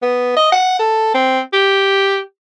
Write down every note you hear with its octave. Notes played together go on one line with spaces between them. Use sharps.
B3
D#5
F#5
A4
C4
G4